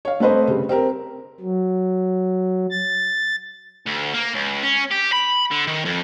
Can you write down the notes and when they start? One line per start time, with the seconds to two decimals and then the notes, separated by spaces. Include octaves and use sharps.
0.05 C#5 F5
0.20 A3 C4 B4 C5 D#5
0.48 C#3 G3
0.69 C4 G4 A#4
1.40 F#3
2.70 A6
3.86 D2
4.14 A#3
4.34 C#2
4.63 C#4
4.91 G4
5.12 B5
5.51 D3
5.67 D#3
5.85 F2